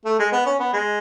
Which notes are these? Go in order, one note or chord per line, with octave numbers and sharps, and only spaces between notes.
A3
G#3
B3
C#4
B3
G#3